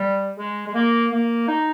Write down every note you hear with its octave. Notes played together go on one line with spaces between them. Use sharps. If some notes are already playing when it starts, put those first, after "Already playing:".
Already playing: G3
G#3
G#3
A#3
A#3
D#4